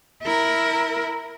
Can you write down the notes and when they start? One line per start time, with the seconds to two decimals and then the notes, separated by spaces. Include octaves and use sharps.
0.22 E4 A#4